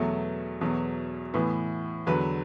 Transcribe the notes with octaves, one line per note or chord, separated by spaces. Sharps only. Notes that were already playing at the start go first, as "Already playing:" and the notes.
Already playing: E2 B2 F#3 A3
E2 B2 F#3
A2 E3 B3
E2 D3 F#3 B4